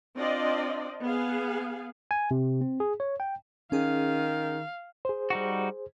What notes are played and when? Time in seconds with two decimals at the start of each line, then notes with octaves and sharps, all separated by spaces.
0.17 C4 D4 F4 D5 D#5
1.01 B3 G#4 F5
2.11 G#5
2.31 C3
2.61 C4
2.80 G#4
3.00 C#5
3.20 G5
3.72 D#3 C#4 G#4 F5
5.05 G#4 C5
5.30 G3 D#4 F#4